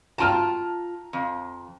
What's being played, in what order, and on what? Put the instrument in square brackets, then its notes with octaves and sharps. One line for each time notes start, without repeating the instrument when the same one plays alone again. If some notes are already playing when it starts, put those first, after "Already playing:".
[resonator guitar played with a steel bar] F4 G5 A5 [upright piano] A#5 F6
[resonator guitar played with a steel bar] F2